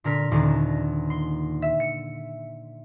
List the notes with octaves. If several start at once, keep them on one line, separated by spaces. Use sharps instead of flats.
A#2 D3 A#4 F6 B6
D#1 D#2 D3
C6
E5
C#7